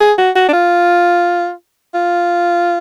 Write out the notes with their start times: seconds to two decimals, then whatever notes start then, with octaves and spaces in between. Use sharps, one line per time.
0.01 G#4
0.18 F#4
0.36 F#4
0.48 D4
0.53 F4
1.94 F4